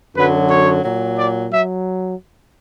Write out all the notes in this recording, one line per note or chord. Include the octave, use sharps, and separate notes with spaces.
F#2 D3 F#3 B4
C#5
A#2 F#3
D5
F#3 E5